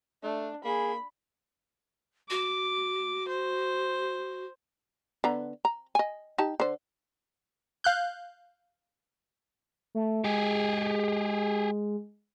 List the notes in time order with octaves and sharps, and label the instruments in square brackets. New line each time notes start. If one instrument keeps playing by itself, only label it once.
[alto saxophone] A3 [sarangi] D4
[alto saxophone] A#3 [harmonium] G#4 [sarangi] B5
[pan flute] F#4 [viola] D6
[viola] C5
[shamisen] D3 B3 A#5
A#5
D#5 G#5
D#4 G4 A5
D3 C5
[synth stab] F5 F#6 G6
[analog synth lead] A3
[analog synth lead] G#3 [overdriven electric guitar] G4 G#4